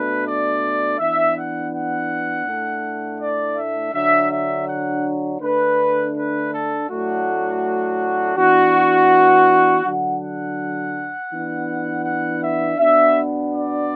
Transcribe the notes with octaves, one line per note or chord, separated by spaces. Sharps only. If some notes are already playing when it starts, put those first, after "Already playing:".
Already playing: B2 A3 D4 B4
D5
E3 B3 D4 E5
F#5
F#5
A2 A3 D4
D5
E5
D3 F#3 D4 E5
E5
F#5
D3 A3 D4 B4
B4
A4
A2 F#3 A3 D4 F#4
E3 B3 D4 F#4
D3 F#3 D4 F#5
F#5
E3 B3 D4
F#5
E5
B2 B3 D4 E5
D5